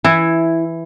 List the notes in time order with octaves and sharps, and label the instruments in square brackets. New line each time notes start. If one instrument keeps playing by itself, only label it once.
[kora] E3 [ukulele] E4